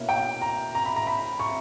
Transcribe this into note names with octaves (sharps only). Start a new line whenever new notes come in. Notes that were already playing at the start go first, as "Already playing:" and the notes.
Already playing: B2 A#3 C#4 E4
G5
A#5
A#5
B5
A#5
B5
C#6